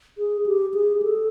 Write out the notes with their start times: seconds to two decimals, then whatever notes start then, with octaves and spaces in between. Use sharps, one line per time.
0.18 G#4
0.46 G4
0.74 G#4
1.02 A4